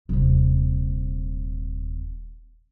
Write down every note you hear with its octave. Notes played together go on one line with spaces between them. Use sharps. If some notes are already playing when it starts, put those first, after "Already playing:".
D#1 C3